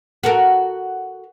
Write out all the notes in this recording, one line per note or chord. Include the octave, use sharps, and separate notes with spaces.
F#4 A4 A#4